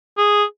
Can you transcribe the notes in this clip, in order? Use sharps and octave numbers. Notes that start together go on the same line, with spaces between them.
G#4